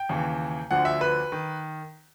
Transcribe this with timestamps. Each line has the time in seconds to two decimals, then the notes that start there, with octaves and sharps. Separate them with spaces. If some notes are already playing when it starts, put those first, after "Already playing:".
Already playing: G5
0.09 D#2 C#3 E3
0.71 D2 D3 F3 F#5
0.85 E5
1.01 B4
1.32 D#3